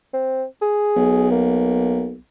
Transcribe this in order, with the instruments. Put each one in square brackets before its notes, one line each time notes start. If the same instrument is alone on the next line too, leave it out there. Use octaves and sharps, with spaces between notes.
[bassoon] C4
G#4
[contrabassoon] B1
[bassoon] A#3